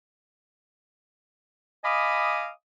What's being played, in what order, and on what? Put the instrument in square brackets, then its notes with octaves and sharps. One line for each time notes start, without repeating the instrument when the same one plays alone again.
[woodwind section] D#5 F5 G#5 B5 D6 D#6